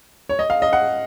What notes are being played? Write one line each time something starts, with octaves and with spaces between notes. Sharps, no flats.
C#5
D#5
F5
D#5
F#5